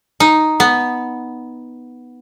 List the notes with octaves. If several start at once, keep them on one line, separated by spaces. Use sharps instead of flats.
D#4
B3